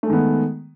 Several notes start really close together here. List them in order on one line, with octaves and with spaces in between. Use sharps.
A3 G#3 D#3 B3